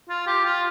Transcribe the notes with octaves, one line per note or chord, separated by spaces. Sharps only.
F4
G4
F4